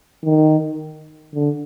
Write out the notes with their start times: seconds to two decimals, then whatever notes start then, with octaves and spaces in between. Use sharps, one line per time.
0.24 D#3
1.34 D3